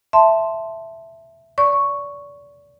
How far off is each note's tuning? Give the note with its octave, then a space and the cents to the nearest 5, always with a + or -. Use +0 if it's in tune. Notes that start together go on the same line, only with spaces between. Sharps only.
E5 +5 A5 +0 C6 +0
D5 -30 C#6 +0